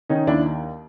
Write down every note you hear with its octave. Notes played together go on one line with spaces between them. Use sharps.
D#3 C#4 D#4
D#2 D4 E4